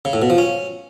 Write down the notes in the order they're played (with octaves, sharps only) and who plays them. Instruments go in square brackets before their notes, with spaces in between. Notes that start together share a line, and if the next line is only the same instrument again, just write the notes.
[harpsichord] C#3
A2
B2
F3
C#4